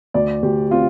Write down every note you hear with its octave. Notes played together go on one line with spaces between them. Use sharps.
D2 D5
D2 G4
C4 F4